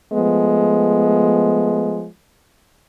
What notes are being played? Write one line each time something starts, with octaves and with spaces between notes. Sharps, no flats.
F3 G#3 A3 B3